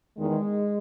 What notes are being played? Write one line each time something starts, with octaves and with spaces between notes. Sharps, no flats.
E2 D#3 G#3